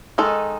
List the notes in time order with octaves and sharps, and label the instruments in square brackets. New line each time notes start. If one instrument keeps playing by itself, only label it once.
[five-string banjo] D#3 G#3 D#4 A4